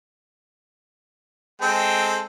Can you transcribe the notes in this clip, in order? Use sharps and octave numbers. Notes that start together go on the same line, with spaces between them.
G#3 C4 A4 G5